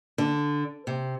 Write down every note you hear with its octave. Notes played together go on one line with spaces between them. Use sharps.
D3
C3